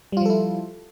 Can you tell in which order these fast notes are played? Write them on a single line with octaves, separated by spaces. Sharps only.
G3 F4 F3 A4 E4